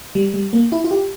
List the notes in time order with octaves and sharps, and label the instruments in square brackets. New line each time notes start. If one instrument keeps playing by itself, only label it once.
[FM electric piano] G3
G3
A#3
E4
F4
G4